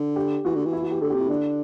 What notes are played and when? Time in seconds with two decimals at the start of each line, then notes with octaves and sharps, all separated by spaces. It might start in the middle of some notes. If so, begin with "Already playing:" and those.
Already playing: D3
0.16 G4
0.45 E3 F#4
0.55 D3
0.65 E3
0.73 E4
0.82 F#4
0.91 G4
1.01 D3 A4
1.10 G4
1.15 C3
1.20 E4
1.29 D3 D4